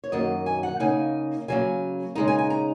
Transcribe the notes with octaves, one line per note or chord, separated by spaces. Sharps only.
C#5
F#2 D#3 F#3 A#3 D#5
G#5
F#5
C#3 A#3 D#4 G#5
C#3 F#3 A#3 G#5
C#3 G#3 D#4 A#5
G#5
G#5
A#5